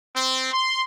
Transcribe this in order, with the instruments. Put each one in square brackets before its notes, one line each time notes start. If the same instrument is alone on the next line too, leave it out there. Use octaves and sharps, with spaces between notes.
[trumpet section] C4
C6